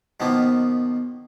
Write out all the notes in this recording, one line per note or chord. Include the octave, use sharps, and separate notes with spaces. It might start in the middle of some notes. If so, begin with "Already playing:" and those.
B2 D#3 F3 A#3 B3